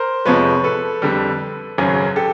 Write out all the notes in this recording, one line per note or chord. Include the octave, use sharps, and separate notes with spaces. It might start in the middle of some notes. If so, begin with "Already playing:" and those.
Already playing: A#4 C5
F2 C3 F3 G#3 B4 C#5
A4 B4
F2 D3 G3
G#1 F#2 C#3 F#3
G4 A4